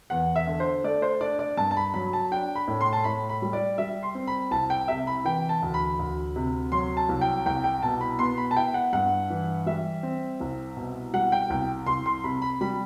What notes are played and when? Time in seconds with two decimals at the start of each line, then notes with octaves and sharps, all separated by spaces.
0.10 E2 F#5
0.36 E5
0.47 D3
0.60 C5
0.84 A3 D5
1.02 C5
1.21 D4 D5
1.39 D5
1.57 G2 A5
1.71 A5
1.77 B5
1.94 F#3 B5
2.13 A5
2.31 D4 G5
2.55 B5
2.68 A2
2.81 C6
2.93 A5
3.04 A2 B5
3.29 B5
3.42 G3
3.53 D5
3.78 G3 E5
4.03 C6
4.15 C4
4.27 B5
4.51 C2 A5
4.70 G5
4.88 C3 E5
5.07 B5
5.25 E3 G5
5.49 A5
5.62 D2
5.74 B5
5.99 D2
6.36 C3
6.72 F#3 C6
6.97 A5
7.09 C2
7.21 G5
7.46 C2 G5
7.64 G5
7.83 B2 A5
8.01 B5
8.19 B3 C6
8.37 B5
8.51 A5
8.56 E4 G5
8.74 F#5
8.93 G2 F#5
9.30 E3
9.66 G3 E5
10.03 C4
10.40 C2
10.77 B2
11.13 G3 F#5
11.32 G5
11.50 C2 G5
11.87 C2 C6
12.06 C6
12.24 C3 B5
12.42 B5
12.61 G3 B5